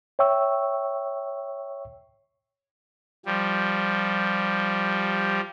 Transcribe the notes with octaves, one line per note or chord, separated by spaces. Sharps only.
C#5 E5 G5 C#6 E6
F3 G3